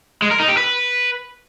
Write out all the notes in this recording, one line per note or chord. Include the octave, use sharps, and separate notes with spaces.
G#3
A#4
D#4
G4
B4